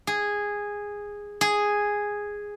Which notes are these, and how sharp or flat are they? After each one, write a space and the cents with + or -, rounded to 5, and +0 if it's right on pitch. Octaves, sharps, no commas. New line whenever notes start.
G#4 -10
G#4 -5